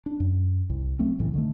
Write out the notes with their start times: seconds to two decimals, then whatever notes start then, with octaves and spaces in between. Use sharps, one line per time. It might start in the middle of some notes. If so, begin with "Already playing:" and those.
0.06 D4
0.20 F#2
0.70 C2
0.99 F#3 A3 A#3 C4
1.19 C2 A2 C#3 E3
1.34 D3 D#3 A3